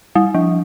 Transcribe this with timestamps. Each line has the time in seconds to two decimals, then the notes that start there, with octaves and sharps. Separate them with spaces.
0.15 G3
0.34 F3